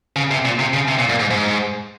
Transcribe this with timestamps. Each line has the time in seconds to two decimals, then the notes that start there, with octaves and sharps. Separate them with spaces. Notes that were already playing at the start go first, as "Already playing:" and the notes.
0.16 C#3
0.31 C3
0.45 A#2
0.59 C3
0.74 C#3
0.88 C3
0.99 A#2
1.09 A#2
1.20 G#2
1.31 G#2